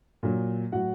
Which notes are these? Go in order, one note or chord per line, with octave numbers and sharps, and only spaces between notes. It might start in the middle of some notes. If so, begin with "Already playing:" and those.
A#2 F#3
A2 F#3 F#4 F#5